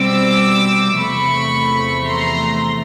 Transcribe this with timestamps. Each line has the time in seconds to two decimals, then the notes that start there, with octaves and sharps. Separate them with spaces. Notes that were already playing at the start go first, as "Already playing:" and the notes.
Already playing: B2 G3 C4 D6 E6
0.98 E2 C3 F3 A3 B5 C#6
2.06 A#5 C6